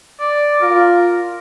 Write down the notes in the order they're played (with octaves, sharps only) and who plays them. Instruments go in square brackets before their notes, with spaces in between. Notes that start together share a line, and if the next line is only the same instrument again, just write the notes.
[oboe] D5
[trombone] F4 [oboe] A#4